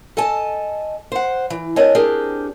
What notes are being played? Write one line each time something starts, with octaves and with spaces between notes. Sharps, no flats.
A4 D#5 G#5 A5
C5 F#5
E3
C4 D4 A#4 C#5 D#5 G#5
C4 D4 G4 G#4 A#4